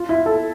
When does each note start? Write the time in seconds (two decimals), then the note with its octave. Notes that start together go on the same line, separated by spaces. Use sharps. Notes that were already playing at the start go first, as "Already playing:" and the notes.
Already playing: F4
0.09 E4
0.26 A4